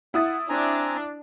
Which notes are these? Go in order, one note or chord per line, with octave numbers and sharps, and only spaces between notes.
E4 F#5 D#6 A6
C4 D4 G#5 A#5